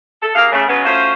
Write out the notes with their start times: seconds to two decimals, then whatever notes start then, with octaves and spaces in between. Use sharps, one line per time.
0.21 A4
0.35 D#2 A#3 G#4 F5
0.52 C#3 A3
0.68 C#3 F#3 G#3 B3 C#4 B4
0.85 A3 C#4 F4 F#4 C5